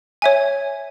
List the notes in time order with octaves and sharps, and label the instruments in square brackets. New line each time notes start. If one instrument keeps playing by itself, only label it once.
[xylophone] C#5 E5 G#5